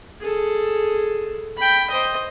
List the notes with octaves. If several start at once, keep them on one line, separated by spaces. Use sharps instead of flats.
G#4 A4
G5 B5
C5 D#5